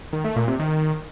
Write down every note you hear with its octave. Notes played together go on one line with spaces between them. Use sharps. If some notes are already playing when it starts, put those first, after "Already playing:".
D#3
A3
A#2
C3
D#3